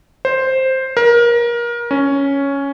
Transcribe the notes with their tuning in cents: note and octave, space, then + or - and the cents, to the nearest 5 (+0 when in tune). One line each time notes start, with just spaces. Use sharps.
C5 +5
A#4 +25
C#4 +5